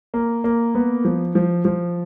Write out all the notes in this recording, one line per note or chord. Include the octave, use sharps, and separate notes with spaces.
A#3
A#3
B3
F3
F3
F3